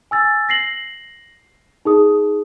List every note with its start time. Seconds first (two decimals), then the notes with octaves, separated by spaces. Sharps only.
0.11 G#5 E6 A6
0.49 A#6 C7 F#7
1.85 D#4 G#4 D#6